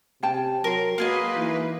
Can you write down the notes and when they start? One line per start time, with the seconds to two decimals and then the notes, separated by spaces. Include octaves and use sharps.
0.23 C3 C#4 G5 A5
0.64 F#3 A#4 C6
0.98 A#3 F4 F#4 G#4 B4 D#5
1.36 E3 D#4